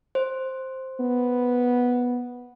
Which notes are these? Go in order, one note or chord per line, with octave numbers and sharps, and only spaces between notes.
C5
B3